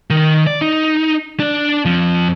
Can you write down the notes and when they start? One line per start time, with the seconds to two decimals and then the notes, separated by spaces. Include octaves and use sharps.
0.10 D#3
0.47 D5
0.62 D#4
1.40 D4 D5
1.85 F2 F3